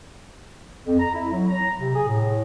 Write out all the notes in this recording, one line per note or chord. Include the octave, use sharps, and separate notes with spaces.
F2
A#5
E4
F#3
A#5
C3
G#4
A2